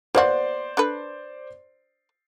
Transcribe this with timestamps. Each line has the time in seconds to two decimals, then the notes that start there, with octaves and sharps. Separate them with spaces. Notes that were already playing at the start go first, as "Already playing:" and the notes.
0.15 A#3 B3 F#4 C5 D5 C6
0.77 D4 A4 B4